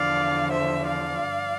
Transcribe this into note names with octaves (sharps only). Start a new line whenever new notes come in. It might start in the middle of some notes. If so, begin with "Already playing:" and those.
Already playing: E2 D3 F3 D5 F5
C5 E5
D5 F5
G2 F3